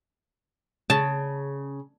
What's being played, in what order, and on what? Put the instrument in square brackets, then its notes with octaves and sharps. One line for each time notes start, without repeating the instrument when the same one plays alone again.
[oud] C#3 [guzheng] A5